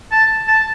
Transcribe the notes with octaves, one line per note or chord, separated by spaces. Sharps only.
A5
A5